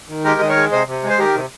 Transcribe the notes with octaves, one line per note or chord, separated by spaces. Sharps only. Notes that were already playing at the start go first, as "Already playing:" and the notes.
D#3
G#3 G4 A#4
D#3 D#5
A#4 C#5
G#3
C3 C5 D#5
C3
G#3
C5
D#3 G4 A#4
C3